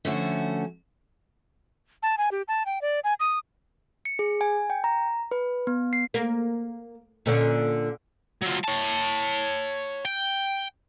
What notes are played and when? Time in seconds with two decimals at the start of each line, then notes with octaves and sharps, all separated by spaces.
0.05 D3 F3 A3 C#4 F#4
2.03 A5
2.18 G#5
2.31 G4
2.48 A5
2.66 G5
2.81 D5
3.04 G#5
3.20 D#6
4.05 C#7
4.19 G#4
4.41 G#5
4.70 G5
4.84 A#5
5.31 B4
5.67 B3
5.93 C7
6.14 A#3
7.26 A#2 D3 C#4
8.42 F#3 F4
8.64 C#5 A5
10.05 G5